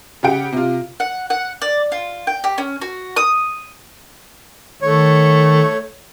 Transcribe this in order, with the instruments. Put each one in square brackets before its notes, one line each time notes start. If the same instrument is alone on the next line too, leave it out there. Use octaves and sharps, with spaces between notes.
[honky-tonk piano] C#3 G4 F#5 G5 D7
C3 F4
[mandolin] F#5
F#5
D5
F4
G5
G4
C#4
F#4
D#6
[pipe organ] D#3 [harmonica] A3 [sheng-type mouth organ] C#5